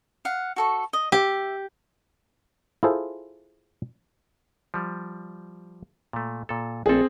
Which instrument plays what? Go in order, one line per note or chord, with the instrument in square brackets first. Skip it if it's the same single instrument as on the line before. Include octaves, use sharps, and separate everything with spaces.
[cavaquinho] F5 F#5
F#4 A4 C#6
D#5
[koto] G4 [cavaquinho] E5
[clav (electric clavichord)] E4 F4 G#4 A4 C5
F3 G3
A#2 A3
A#2 A4
[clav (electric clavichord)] A#1 A4 [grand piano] C4 G#4